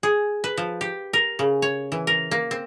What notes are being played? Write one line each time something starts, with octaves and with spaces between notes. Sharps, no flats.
G#4
B4
F3
G4
A#4
C#3
C#5
E3
A#4
A#3
C4